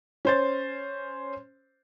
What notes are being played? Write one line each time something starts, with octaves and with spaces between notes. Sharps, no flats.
C#4 C5 A6